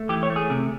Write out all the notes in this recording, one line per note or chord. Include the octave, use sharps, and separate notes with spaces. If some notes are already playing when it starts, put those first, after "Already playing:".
Already playing: A3
E3 G4
C#5
A3
G#4
C3